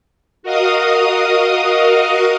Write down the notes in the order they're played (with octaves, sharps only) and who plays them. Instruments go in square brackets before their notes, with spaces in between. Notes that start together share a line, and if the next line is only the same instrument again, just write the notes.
[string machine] F#4 A#4 D#5 F5 D#6